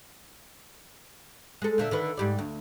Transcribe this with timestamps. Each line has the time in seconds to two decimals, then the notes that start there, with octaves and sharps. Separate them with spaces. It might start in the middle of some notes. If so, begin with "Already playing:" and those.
1.62 G#3 A4
1.78 A#2 D3 E5
1.91 D3 D#3 B4
2.17 G#2 G3 D5
2.39 D2